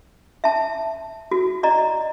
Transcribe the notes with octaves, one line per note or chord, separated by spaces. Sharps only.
E5 A5
F#4
D5 D#5 A#5